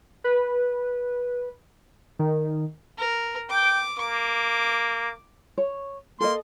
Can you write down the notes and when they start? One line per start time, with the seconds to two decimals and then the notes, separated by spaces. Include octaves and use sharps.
0.24 B4
2.19 D#3
2.99 A#4
3.50 G5 D6
3.99 A#3 D6
5.58 C#5
6.20 A#3 A4 D#5 C6